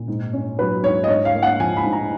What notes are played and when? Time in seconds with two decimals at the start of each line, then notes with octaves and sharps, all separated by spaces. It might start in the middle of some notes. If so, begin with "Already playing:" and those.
Already playing: A#2
0.08 G#2
0.33 C#4
0.59 F#3 B4
0.83 G#2 C#5
1.04 D#5
1.08 G#2 C#5
1.25 F5
1.34 A#3
1.43 F#5
1.60 F3 G#5
1.77 B5
1.84 G#2
1.93 A#5